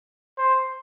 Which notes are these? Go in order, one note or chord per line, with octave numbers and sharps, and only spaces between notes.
C5